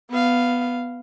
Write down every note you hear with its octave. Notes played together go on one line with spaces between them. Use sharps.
B3 F5